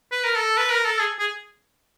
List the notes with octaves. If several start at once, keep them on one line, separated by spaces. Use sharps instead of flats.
B4
A#4
A4
B4
A#4
A4
G#4
G#4